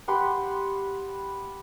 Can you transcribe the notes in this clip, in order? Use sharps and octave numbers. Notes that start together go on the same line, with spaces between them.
G4 F#5 B5 C6